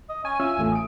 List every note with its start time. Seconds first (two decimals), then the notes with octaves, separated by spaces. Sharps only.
0.09 D#5
0.25 C#4 G#5
0.40 C#4 F4 E5 E6
0.58 A1 A3
0.72 D#6 D7